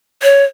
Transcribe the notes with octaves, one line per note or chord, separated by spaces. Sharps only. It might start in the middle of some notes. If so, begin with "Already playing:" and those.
C#5